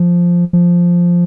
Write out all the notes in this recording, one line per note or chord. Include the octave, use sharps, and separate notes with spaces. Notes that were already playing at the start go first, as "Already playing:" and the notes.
Already playing: F3
F3